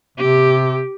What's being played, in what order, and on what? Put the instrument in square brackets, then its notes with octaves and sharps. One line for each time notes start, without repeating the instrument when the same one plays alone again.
[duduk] C3 [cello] G4